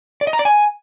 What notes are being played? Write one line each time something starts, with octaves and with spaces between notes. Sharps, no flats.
D5
D#5
A#5
D5
G#5